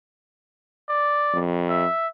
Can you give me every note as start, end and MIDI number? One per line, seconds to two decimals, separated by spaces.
0.89 1.40 74
1.34 1.85 41
1.70 2.08 76